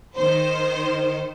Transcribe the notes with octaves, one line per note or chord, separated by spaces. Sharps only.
D#3 C5